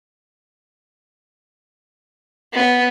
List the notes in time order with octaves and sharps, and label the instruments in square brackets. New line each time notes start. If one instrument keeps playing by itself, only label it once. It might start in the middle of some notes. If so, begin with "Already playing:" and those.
[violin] B3